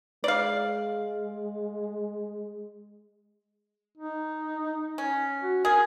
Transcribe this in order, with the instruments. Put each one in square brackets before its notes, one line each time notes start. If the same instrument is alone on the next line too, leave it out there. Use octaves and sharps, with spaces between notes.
[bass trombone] G#3 [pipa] D5 F5
[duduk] D#4
[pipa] C#4
[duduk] F#4
[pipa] G#4 [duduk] A#4